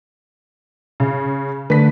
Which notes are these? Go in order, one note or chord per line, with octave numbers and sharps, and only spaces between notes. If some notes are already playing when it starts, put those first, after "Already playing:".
C#3
D3 A3 B4 B6